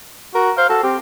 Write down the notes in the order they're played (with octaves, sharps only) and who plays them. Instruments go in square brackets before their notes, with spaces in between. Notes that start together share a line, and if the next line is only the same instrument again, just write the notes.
[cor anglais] F#4 [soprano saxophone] A#4
[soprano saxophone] C5 [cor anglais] F5
[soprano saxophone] F#4 [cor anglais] A4
[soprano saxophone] C4 [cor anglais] G4